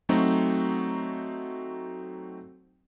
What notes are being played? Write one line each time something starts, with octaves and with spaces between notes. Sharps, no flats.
F#3 A3 C4 D#4 F#4